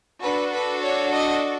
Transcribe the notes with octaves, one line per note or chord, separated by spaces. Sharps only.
D4 F#4 A4 B4
B4
C#5
D#5